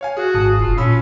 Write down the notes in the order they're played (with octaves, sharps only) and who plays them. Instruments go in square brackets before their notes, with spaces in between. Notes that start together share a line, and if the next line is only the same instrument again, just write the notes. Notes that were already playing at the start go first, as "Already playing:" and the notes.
[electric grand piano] C#5 F5 G#5
[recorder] F#4 [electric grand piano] G#4
[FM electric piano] G#1 A5 D#6 [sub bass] G#2
[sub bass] F1 [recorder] F4
[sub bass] A#2 [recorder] C#4 [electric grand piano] F4 B5 E6